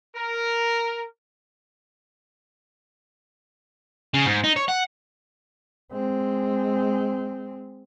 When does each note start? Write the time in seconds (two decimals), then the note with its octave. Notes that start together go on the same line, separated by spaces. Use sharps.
0.16 A#4
4.14 C#3
4.26 G#2
4.44 D#4
4.56 C#5
4.68 F#5
5.93 G#3 C4